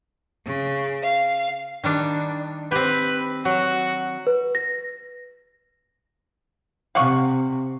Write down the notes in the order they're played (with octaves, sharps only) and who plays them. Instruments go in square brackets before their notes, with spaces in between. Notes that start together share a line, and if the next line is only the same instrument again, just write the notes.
[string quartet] C#3
F5
[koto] D#3 G3 D4
[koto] C4 G4 [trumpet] B4
[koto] F#3 [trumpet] F#4
[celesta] B4
A#6
[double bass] C3 [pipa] F5 F#5 C#6